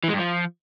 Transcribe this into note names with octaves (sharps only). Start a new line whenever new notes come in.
E3
G#3
G2
F3